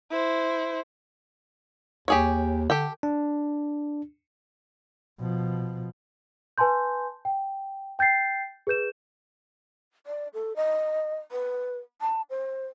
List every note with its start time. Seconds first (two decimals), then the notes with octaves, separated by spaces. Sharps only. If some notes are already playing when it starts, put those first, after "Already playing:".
0.11 E4 C5
2.08 D#2 G4 G#4 C#5
2.70 D3 G4 A4 G5
3.03 D4
5.20 B2 F3
6.58 B4 G#5 A5 C6 G6
7.25 G5
7.99 G5 G6 A6 C7
8.67 G#4 B4 G6 E7
10.07 D5
10.34 A4
10.56 D#5
11.32 B4
12.01 A5
12.30 C5